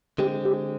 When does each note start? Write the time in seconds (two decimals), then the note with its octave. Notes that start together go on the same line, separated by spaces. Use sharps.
0.18 D3 G#3 C4 G4
0.45 G4